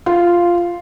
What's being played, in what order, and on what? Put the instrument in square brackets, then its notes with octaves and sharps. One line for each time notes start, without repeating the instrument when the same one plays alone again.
[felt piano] F4